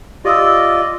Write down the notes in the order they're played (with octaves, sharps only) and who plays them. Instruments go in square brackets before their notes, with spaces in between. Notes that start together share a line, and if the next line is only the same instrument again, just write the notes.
[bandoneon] F4 D5 D#5 [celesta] G4 D#6 E6